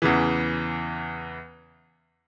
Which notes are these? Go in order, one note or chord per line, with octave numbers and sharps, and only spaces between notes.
E2 C#3 E3